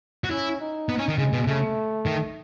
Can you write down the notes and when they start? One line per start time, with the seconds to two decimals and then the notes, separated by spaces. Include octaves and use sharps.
0.24 F#4
0.31 C#4 E4
0.60 D#4
0.89 B3
0.99 C#4
1.09 D#3
1.18 C#3 G#3
1.33 B2
1.47 C#3 A3
2.06 D#3